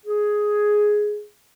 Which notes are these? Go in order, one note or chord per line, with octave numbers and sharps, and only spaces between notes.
G#4